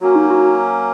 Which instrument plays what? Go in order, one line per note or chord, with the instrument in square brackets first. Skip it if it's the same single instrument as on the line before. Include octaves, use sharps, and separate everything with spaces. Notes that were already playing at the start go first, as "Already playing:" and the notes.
[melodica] F#3 A#3 C#4 [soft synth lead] F#4
[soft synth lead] D#4
F#4